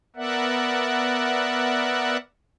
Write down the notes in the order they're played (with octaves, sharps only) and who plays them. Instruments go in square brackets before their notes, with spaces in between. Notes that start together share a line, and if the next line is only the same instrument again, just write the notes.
[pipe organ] B3 A#4 D5 E5 F#5